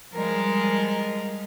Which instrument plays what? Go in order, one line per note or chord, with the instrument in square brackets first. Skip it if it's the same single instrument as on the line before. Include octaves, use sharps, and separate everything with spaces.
[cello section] F3 G3 [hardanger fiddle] G#3 A#4